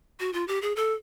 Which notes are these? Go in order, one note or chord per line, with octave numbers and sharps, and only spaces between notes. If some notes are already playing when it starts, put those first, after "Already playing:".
F#4
F4
G4
G#4
A4